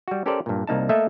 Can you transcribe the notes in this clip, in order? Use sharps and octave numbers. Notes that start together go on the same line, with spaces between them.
G3 F#4
C#4 G4 A4 A#4 C5 D5
G2 A#2
C2 A#3 D#4 A5
A3 A#3 A4 D#5 E5